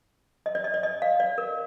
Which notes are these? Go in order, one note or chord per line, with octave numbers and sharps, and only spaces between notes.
D#5
D5
D#5
D5
D#5
F5
D5
A#4